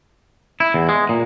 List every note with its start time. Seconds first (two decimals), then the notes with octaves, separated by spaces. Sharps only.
0.60 E4
0.74 E2
0.89 G#3
1.09 A#2